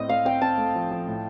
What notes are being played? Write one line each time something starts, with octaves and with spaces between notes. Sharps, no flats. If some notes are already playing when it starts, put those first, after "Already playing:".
Already playing: A2 C4 D#5
A3 F5
C4 G5
C4 A5
A3
F3
F3
A2